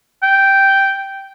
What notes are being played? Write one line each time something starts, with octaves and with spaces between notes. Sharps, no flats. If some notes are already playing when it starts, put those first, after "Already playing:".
G5